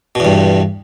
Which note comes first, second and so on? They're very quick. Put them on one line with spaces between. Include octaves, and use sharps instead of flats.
B2 E2 G2